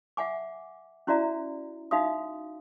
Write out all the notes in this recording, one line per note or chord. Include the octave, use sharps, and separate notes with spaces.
E5 F#5 G#5 D6
C#4 E4 F#4 D5 E5 A#5
D#4 F#4 E5 F5 D#6